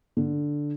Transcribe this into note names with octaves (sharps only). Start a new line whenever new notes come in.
D3